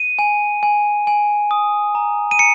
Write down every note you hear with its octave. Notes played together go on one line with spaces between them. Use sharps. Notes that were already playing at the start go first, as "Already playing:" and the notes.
Already playing: D#7
G#5
G#5
G#5
D#6
A#5
D#7
A#5 C#7